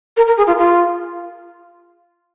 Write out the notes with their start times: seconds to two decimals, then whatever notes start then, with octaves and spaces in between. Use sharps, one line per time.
0.17 A#4
0.27 A#4
0.37 G#4
0.47 F4
0.58 F4